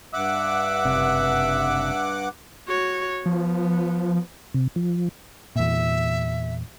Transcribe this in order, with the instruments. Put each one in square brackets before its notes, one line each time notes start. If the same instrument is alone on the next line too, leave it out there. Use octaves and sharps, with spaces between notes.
[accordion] G2 F#5 D6 [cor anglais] E5
[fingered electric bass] F#1 C3
[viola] F#4 C#5
[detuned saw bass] F3 [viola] B3
[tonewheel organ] C3
F3
[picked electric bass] E2 A#2 [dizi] E5